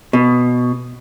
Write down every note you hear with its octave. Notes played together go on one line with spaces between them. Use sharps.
B2